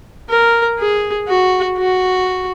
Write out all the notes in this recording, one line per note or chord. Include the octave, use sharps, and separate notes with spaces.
A#4
G#4
F#4
F#4